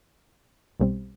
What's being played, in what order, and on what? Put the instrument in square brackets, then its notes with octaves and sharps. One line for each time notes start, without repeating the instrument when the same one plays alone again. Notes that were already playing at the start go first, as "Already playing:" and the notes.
[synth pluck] B1 B2 G3 C4